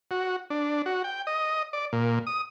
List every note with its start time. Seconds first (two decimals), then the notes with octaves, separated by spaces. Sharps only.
0.11 F#4
0.50 D4
0.86 F#4
1.04 G5
1.27 D#5
1.73 D5
1.93 A#2
2.27 D#6